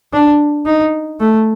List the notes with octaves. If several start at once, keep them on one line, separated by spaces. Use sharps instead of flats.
D4
D#4
A3